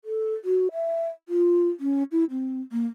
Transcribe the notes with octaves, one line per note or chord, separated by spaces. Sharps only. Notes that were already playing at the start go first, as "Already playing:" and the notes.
A4
F#4
E5
F4
C#4
E4
C4
A#3